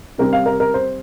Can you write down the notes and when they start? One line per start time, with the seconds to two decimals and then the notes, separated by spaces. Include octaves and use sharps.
0.18 C3 G3 C4 A#4
0.33 F5
0.46 A#4
0.60 A#4
0.74 C5